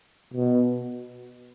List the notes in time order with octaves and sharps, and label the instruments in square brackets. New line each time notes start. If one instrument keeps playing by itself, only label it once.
[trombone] B2